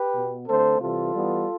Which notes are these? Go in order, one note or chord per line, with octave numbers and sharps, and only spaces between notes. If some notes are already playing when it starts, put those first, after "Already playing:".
Already playing: G4 B4
B2 B3
D3 A3 C4 A4 C5
C3 E3 G3 F4 A4
E3 G3 B3